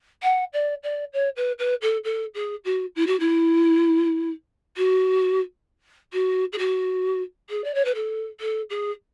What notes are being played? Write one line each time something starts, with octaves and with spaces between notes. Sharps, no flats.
F#5
D5
D5
C#5
B4
B4
A4
A4
G#4
F#4
E4
F#4
E4
F#4
F#4
G#4
F#4
G#4
D5
C#5
B4
A4
A4
G#4